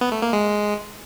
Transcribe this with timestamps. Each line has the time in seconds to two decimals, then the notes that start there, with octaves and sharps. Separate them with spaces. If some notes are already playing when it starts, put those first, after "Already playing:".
0.01 B3
0.12 A3
0.22 A#3
0.33 G#3